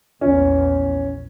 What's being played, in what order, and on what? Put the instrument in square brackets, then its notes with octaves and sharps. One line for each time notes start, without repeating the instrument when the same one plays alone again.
[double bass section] A#1 E2 [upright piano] C#4